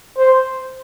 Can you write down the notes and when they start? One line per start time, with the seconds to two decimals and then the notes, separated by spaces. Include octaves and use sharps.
0.18 C5